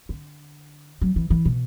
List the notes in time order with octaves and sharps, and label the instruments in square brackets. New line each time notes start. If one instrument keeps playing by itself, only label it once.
[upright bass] D3
F#3
E3
E3
B2